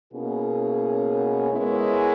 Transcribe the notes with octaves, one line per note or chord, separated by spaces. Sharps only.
B2 A#3 C#4 E4 G#4
G#3 B3 E4 A#4 C#5